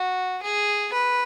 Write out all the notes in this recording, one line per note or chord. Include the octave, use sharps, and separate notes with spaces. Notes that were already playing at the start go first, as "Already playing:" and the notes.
Already playing: F#4
G#4
B4